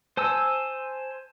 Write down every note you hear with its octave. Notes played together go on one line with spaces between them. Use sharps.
C5 G#5 A5 E6